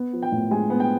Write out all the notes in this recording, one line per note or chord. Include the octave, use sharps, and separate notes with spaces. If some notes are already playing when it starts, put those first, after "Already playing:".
Already playing: B3
F3
G5
A2
G#3 G#5
B3
G5